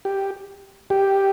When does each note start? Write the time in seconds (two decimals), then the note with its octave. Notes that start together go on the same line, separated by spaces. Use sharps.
0.05 G4
0.90 G4